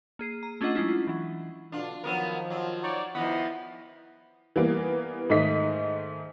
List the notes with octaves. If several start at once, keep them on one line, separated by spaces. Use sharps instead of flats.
A#3 G#4 C7 D#7
A#5
A3 C#4 D4 F4 D#5 F#5
F#3 G#3 C#4 E4 F4
E3 F#3
B2 D3 D4 F4
D#3 F3 F#3 B3 A#4
F#3
D#4 C#5 D5
D#3 F3 B3 E4 D#5
E3 G3 A#3 B3
G#2 D#3 A3 D#5 B6